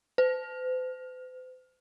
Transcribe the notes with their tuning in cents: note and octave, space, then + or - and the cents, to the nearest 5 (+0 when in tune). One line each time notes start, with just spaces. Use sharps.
C5 -45